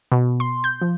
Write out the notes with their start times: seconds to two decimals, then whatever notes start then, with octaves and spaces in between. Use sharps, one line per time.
0.12 B2
0.40 C6
0.64 G6
0.81 F3